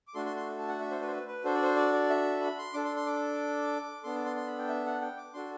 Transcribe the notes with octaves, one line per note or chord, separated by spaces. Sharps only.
D6
A3 D4 F#4 A4 C6
C6
C6
A5
F#5
E5
C5
B4
C5
B4
B4
D4 F#4 A4 C5
D5
C5
D5
D5
E5
B5
C6
D4 A4 D6
C6
C6
D6
B3 D4 A4 C6
D6
C6
C6
B5
G5
E5
F#5
G5
D6
D4 F#4 A4 C6